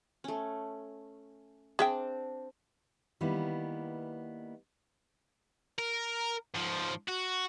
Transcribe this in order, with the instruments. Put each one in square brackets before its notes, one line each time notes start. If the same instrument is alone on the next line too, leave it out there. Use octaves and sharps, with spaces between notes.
[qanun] A3 C#4
[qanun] C4 D4 C5 [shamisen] G#4 E5 G5
[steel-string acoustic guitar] D#3 G3 A#3 B3 E4
[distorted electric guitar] A#4
G#2 F3
F#4